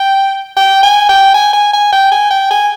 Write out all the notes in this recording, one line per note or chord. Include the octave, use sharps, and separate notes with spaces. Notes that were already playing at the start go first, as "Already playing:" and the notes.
Already playing: G5
G5
G#5
G5
G#5
G#5
G#5
G5
G#5
G5
G#5